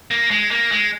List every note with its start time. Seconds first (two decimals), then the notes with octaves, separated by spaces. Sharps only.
0.11 A#3
0.31 G#3
0.51 A#3
0.72 G#3